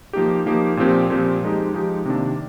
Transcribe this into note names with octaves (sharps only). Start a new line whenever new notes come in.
F3 A#3 D#4 G4
F3 A#3 D#4 G4
A#2 F3 C4 G4
A#2 F3 C4 G4
F3 G#3 D#4 G4
F3 G#3 D#4 G4
C3 D#3 A#3 D4